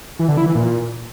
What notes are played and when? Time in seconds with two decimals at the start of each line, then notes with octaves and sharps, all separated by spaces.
0.19 E3
0.28 D3
0.37 E4
0.46 E3
0.55 A#2